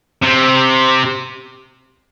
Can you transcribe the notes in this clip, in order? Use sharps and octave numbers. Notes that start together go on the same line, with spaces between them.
C3